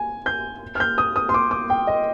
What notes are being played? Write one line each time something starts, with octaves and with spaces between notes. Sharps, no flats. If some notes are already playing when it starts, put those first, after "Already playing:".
Already playing: G#5
G6
F6
G6
D#6
D#6
C6
D6
D6
G5
D#5